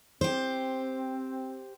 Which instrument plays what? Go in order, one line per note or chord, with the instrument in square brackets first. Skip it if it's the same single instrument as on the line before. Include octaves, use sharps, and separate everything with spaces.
[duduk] C4 [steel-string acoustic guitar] G4 C5